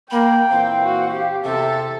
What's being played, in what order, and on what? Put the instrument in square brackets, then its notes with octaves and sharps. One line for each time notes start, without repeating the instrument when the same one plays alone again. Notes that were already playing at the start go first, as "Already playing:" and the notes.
[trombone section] A#3 [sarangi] G5 [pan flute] B5
[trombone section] A#2 E3 C4 [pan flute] F5
[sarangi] F#4
G4
[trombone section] E2 C3 [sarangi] A4 [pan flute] E5